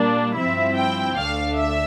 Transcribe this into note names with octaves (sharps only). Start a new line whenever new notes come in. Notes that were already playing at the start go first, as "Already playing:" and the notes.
Already playing: A#2 G3 A#3 D4
G2 F3 C4 E4 E5
G5
D2 D3 A3 D4 F5
E5